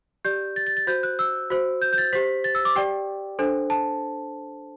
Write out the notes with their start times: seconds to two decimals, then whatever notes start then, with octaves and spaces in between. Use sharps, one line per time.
0.25 G4 D5 G6
0.56 A6
0.67 A6
0.77 A6
0.87 F#4 C5 G6
1.03 F#6
1.19 E6
1.50 F#4 C5
1.82 G6
1.93 G6
1.98 A6
2.13 G4 C5 B6
2.44 A6
2.55 E6
2.65 D6
2.76 G4 D5 G5
3.39 D4 A4 C5
3.70 A5